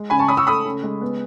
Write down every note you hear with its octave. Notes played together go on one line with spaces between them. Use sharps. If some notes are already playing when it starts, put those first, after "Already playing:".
Already playing: G#3
C#3 G#5 B5
A5 C#6
C#4 B5 D#6
C#6 E6
A3 B5 D#6
C#3
G#3
B3